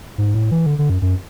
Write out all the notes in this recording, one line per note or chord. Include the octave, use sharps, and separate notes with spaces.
G#2
A2
E3
D3
D3
F#2
F#2